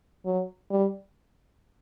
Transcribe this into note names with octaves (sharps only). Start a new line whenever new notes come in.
F#3
G3